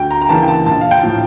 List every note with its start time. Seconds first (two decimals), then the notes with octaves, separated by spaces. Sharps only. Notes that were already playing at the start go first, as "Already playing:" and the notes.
Already playing: D2 G5
0.11 A#5
0.22 A#5
0.29 C#3 E3 A#3 A5
0.43 G5
0.48 A5
0.66 A#1 A5
0.81 F5
0.91 G5
1.03 A2 F3